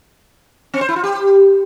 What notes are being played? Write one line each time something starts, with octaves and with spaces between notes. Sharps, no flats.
C4
C5
E4
F4
G4